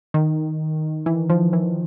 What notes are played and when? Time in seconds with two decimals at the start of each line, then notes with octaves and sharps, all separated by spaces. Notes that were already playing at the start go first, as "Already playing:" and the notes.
0.14 D#3
1.06 E3
1.30 F3
1.53 E3